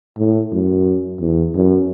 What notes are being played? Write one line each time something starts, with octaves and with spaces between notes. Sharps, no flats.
A2
F#2
E2
F#2